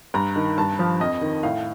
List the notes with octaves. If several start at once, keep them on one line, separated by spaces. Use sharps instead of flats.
G2 A#5
D#3
G2 A5
F3
F2 D#5
D#3
A2 F5